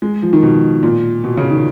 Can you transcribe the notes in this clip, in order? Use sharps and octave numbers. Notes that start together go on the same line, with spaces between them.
G#3
F3
D#3
B2
A#2
B2
C#3
D#3